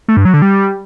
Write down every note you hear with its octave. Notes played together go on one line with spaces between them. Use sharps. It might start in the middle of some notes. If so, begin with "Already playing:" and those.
A3
G2
F#3
D3
G3